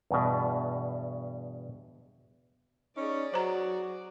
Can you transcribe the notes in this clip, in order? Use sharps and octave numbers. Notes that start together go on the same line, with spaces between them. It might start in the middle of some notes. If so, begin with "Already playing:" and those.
E2 G2 B2
C#4 D#4 G#4 D5
F#3 F#4 C5 A#5